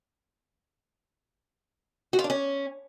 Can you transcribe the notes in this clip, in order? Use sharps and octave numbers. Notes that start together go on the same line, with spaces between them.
F#4
F4
D4
C#4